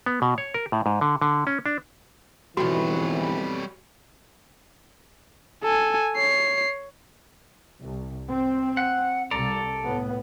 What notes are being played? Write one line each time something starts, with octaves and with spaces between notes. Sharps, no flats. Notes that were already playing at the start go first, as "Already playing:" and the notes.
B3
B2
C#5
A#4
A2
G#2
D3
D3
C#4
D4
G1 F2 G#2 B2 E3 G3 F#4 C#5
A4 G#5
C#5 C7
C2
C4
F#5
C2 A4 D5 A#5
A2 B3